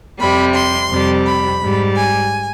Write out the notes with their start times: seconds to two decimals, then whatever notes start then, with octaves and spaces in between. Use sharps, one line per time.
0.19 F2 C3 G3 B5
0.54 C6
0.91 F2 C3 G3
1.26 B5
1.61 G#2 G3
1.97 G#5